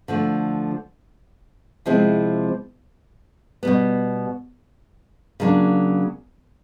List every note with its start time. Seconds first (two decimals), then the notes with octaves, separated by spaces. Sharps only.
0.08 D3 F3 A3
1.86 C3 F3 G#3 C4 E4
3.63 B2 G3 B3
5.40 C#3 F#3 A#3 D4